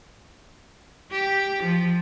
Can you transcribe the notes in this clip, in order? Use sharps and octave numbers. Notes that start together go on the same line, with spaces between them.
G4
F3